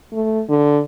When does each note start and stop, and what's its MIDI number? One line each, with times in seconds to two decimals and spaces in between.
0.12 0.41 57
0.49 0.81 50